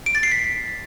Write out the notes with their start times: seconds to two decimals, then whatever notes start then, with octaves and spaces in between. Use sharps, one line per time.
0.06 D7
0.15 A6
0.23 C7
0.32 B6